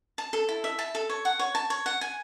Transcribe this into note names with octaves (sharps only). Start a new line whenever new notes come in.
A5
A4
E4
E5
A5
A4
C#5
F#5
C#5
A5
C#5
F#5
G#5